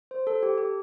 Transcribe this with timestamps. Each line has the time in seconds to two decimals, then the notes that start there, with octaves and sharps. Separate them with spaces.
0.11 C5
0.27 A4
0.43 G4
0.58 G4